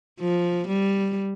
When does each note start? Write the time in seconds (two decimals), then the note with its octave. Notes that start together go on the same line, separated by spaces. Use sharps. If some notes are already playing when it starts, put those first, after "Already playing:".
0.20 F3
0.68 G3